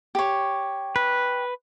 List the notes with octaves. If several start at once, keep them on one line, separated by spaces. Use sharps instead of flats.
G4 C#5
B4